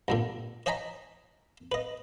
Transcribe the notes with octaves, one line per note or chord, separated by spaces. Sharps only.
G2 A#2 D3
C#5 D#5 G5 G#5 A#5 B5
B4 D#5